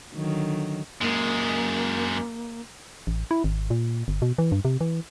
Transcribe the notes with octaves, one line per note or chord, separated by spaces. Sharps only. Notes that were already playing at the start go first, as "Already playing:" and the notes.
D3 D#3 F#3
F#2 G#3 A#3
A1
E4
G#1
A#2
G1
B2
E3
G2
C3
E3